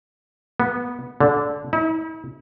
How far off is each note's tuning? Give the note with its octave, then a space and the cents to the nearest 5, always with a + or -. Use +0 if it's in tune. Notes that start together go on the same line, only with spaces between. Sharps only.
B3 -15
D3 -15
E4 -45